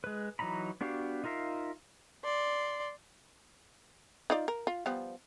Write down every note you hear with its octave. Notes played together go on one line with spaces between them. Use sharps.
G#3 B4
E3 F#3 D#4 A#5 B5
B3 D4 F#4 G4 F5
D#4 F4 A#4 E5 F5
D5 C6
D#4 F4 D5
A#4
F4
F3 G3 B3